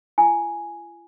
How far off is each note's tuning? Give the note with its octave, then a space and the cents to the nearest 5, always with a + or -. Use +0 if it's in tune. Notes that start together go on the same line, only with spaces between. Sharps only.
F4 -45 G#5 +0